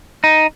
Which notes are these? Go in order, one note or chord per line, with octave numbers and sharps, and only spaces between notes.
D#4